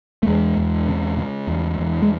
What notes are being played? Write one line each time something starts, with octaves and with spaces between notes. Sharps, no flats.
A3
E2 G#3
E2
C#3
C#3
E2
E2
G#3